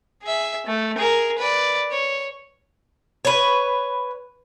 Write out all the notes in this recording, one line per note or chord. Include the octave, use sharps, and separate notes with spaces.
G#4 E5
A3
G#4 A#4
B4 D5
C#5
B4 C#5